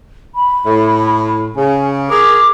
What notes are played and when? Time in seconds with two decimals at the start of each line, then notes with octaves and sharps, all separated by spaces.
0.35 B5
0.66 A2
1.56 C#3 G#5
2.10 G#4 A#4 D6